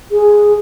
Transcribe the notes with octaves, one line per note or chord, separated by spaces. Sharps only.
G#4